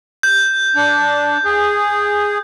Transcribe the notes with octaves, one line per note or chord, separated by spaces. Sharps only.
G6
D4
G#4